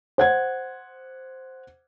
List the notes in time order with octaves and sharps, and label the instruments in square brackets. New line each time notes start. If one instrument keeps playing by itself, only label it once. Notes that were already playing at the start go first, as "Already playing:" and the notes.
[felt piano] C5 F#5 G#6